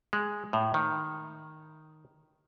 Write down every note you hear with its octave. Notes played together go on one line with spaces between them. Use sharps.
G#3
A2
D#3